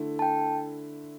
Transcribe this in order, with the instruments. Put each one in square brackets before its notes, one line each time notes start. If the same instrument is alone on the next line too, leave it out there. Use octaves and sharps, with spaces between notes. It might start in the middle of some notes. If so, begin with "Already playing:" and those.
Already playing: [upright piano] D3 A3 E4
[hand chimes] A5
G5